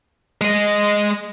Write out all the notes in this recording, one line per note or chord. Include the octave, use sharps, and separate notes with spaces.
G#3 D#5